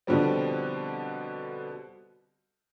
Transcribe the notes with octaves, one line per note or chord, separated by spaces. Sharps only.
B2 D3 F3 G3 C4